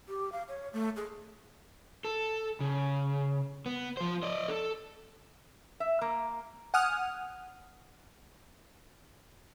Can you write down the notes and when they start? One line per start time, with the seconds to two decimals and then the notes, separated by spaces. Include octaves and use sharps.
0.09 G4
0.32 F5
0.48 C#5
0.73 A3
0.96 G#4
2.05 A4
2.60 C#3
3.66 B3
3.97 F3 C5
4.23 D5 D#5
4.48 A4
5.80 E5
6.01 A#3
6.74 F#5 G#5 D#6 F6